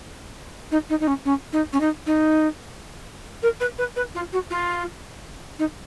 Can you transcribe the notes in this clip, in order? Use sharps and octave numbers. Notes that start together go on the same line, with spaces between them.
D#4
D#4
D#4
C#4
C#4
D#4
C#4
D#4
D#4
A#4
B4
B4
B4
F4
F#4
F4
D#4